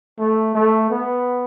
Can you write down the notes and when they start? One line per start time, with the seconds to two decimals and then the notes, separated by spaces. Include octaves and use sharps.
0.19 A3
0.55 A3
0.90 B3